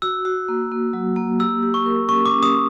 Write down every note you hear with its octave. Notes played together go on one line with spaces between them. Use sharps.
F#4 E6
F#4
A#3
A#3
F#3
A#3
G4 E6
G4
C#6
A#4
C#4 C#6
D6
C#4
D#6